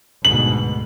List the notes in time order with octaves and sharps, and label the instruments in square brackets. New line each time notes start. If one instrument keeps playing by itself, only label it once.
[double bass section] D2 G#2 B2 [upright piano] F#7